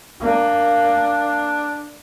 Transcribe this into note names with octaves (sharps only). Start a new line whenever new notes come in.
A#3 D4